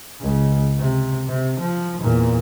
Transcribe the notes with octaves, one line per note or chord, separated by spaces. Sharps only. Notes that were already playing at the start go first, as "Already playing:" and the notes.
C#2
C3
C3
F3
E2 A#2